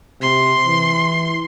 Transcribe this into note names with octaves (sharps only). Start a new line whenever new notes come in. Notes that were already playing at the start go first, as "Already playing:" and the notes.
C3 C6
E3